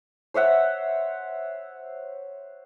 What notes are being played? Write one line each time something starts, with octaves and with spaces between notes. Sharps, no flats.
C5 C#5 E5 F#5